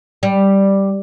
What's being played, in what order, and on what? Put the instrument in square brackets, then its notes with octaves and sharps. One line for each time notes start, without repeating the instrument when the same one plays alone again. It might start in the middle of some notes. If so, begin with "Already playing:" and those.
[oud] G3